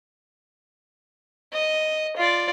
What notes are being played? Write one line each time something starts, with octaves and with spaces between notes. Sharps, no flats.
D#5
F4 D5